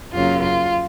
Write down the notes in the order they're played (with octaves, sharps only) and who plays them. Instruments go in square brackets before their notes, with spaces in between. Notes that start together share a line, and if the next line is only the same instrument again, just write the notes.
[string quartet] F#2 C#3 F#3 A#3 F4
F4